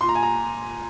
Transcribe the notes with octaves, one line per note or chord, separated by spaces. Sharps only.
A#2 C6
A#5
G#5
A#5